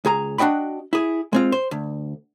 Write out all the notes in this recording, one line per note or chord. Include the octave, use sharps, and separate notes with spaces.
C#2 G#4 A#5
D4 F#4 D#5 G5 B5
E4 G#4
G#3 C4 F4
C5
D2